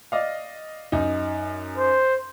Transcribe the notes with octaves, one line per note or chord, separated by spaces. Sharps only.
D5 D#5 F5
F#2 D#4
C5